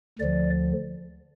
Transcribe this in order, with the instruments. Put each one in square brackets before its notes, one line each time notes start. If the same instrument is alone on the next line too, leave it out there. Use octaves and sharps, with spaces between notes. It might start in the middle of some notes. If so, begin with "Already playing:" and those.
[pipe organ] D2 D3 F3 D5